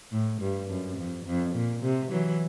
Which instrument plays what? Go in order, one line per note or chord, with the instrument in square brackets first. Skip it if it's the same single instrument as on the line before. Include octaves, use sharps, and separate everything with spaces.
[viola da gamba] A2
G2
F#2
F2
F2
A#2
C3
E3 F#3